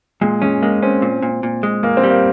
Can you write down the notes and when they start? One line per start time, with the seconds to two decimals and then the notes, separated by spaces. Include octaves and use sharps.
0.21 A#2 G#3
0.42 G#3 C#4
0.62 G#3 A#3
0.83 C4 C#4
1.02 A#2
1.23 A#2
1.43 A#2
1.63 G#3
1.83 A#2 A#3
1.97 C4
2.04 G3
2.10 A#3